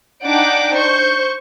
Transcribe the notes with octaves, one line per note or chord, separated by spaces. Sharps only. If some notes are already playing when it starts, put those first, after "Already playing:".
D4 D#4 F#5 G5 D6 D7
C5 C#6 G6